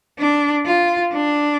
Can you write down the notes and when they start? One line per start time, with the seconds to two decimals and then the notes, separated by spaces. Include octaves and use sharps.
0.19 D4
0.66 F4
1.12 D4